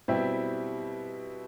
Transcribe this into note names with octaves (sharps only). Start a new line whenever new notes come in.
B2 G3 C4 E4 G4